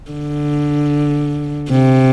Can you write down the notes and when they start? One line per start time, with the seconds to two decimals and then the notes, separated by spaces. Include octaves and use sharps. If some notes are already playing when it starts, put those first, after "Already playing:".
0.11 D3
1.71 C3